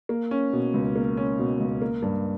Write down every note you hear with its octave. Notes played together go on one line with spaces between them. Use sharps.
A#3
C#4
B2
C#2
A#3
C#4
B2
C#2
A#3
G2